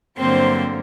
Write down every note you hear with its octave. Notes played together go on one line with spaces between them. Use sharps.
G2 D3 F#3 A#3 C4 C5